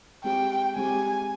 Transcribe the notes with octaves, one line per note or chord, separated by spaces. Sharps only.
G#3 C4 G4 G5
G#3 C4 G4 G#5